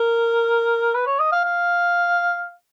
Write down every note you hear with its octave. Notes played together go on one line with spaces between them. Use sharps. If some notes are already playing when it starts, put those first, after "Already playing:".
Already playing: A#4
B4
C#5
D#5
F5
F5